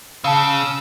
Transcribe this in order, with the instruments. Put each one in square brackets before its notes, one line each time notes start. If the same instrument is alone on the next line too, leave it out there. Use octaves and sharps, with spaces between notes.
[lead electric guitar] C#3 [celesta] F5 A5 [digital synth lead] E6